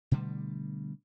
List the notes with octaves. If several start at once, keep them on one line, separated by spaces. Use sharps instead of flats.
B2 D3 G3 A3